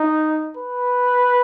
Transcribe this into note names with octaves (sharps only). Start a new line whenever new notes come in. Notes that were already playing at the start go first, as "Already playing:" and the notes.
Already playing: D#4
B4